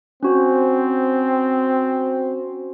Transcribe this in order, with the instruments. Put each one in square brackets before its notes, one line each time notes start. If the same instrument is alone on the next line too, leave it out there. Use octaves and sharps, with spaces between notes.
[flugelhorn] C4 [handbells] C#4 F#4 C5